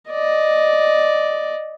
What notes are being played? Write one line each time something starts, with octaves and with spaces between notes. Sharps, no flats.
D5 D#5